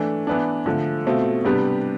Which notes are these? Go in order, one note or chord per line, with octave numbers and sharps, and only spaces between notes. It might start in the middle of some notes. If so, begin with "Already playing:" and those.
Already playing: E3 A3 D4
E3 B3 D4
D3 F3 A3
B2 A3 C4 F4
C3 G3 B3 D4 G4